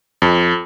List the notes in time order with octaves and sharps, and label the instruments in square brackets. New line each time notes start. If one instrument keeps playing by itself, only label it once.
[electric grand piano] F2